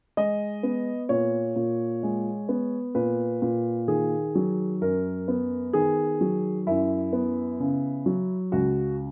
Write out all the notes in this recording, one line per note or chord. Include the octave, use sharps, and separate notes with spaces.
G#3 D#5
B3
A#2 C#5
A#2
G#3
B3
A#2 B4
A#2
D#3 G#4
F#3
F#2 A#4
B3
D#3 G#4
F#3
F#2 E4
B3
C#3
F#3
C#2 F#4